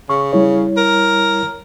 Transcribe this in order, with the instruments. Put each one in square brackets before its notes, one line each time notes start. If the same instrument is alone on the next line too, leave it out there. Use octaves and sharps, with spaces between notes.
[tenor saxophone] C#3 [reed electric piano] C#6
[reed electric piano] G3 E4 C#5
[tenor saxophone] A#4